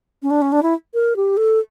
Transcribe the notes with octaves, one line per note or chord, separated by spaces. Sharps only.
C#4
D4
C#4
D4
E4
A#4
G4
A4